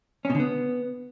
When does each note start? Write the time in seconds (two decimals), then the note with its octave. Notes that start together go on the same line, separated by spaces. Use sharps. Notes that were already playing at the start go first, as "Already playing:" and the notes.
0.25 C#4
0.30 B2
0.35 D3
0.40 B3